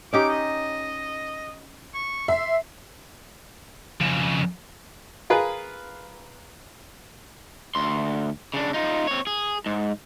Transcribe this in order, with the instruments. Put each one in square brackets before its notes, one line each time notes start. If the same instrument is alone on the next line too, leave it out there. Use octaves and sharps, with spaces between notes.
[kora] C#4 D#4 G4 [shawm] D6
[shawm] D#5
C#6
[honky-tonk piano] E5 [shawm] C6
[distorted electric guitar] F2 C#3
[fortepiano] F4 G#4 A#4 B4
[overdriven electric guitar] D2 C6
C#3 D4
D#4 F4
C4 C#5
G#4
G#2